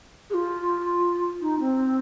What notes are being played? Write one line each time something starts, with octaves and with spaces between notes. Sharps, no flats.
G#4
F4
D#4
C4